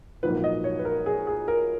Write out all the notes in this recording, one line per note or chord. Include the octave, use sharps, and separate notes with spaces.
A#1 G#2 F#3 A#3 B4
D#5
C#5
B4
A#4
G#4
G#4
A#4